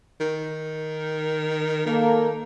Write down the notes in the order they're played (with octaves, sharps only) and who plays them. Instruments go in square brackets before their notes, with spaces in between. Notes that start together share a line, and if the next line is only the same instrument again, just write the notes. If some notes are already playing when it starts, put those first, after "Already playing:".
[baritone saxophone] D#3
[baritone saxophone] D#3 [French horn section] A#3 A4